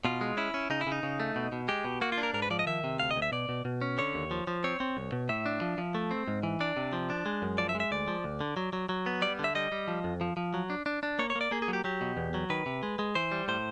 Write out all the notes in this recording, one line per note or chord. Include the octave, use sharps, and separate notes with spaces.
B2 F4
G#3
C#4 E4
C#4
C#3 D#4
E4
C#3 D#4
C#3
A3
B2
B2
G#3 G4
B2
A#3 F#4
F4
D4
A#4
G#2 A#4
B4
F3 D5
D#5
D#3 E5
C3
D2 F5
D#5
D2
E5
B2 D5
B2
B2
C#4
D3 C#5
D#2
F3
F3
C4 C#5
C4
C2
B2
A2 E5
D4
F3
F3
A3
C4
G#2
E3
D4 D5
C3
F3
D4
G#3
F#2
F3 D5
E5
G#3
E5
D2 D5
F3
D2
D3
F#3
F#3
F#3
B3
G3 D5
D3
E5
G3 D#5
G3
F3
F2
F3
F3
F#3
D4
D4
D4
A#3 C#5
C#5
A#3
D5
A#3 G#4
G#4
F#3
G4
F#3 G4
B2
E2
F#3
D#3 B4
C3
G#3
G#3
E3 C5
G3
A2 C5